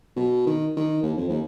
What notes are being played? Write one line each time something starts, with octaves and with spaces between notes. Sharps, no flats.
B2
D#3
D#3
D#2
F2
D#2